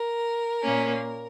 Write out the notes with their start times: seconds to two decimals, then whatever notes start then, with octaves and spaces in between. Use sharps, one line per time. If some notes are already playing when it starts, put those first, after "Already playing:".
Already playing: A#4
0.62 A#2 A#3 C#4